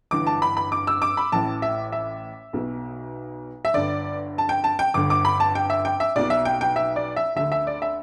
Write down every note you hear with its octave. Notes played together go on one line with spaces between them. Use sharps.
G1 G2 E3 D6
A5
B5
B5
D6
E6
D6
B5
A1 A2 E3 A5
E5
E5
B1 B2
E5
G1 G2 D3 D5
A5
G5
A5
G5
G1 G2 D3 D6
D6
B5
A5
G5
E5
G5
E5
B1 B2 D5
E5
G5
G5
E5
D5
E5
D2 D3 E5
E5
D5
E5